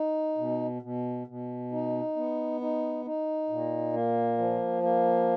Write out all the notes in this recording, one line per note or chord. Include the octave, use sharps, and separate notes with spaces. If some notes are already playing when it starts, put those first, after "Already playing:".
Already playing: D#4
B2
B2
B2
D#4
B3
D#4
D#4
A#2
A#3
F3
A#3